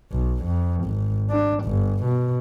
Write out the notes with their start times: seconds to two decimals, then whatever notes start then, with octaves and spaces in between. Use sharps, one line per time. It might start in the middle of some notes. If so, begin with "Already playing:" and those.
0.12 B1
0.45 F2
0.85 G#1
1.30 D4
1.65 G1
2.05 B2